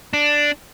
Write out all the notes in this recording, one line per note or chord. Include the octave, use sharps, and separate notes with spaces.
D4